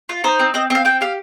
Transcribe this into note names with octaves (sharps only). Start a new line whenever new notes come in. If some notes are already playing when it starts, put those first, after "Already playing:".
F4
D#4 C5
C4
C4 D#5
C4 F5
C4 G5
G4 F5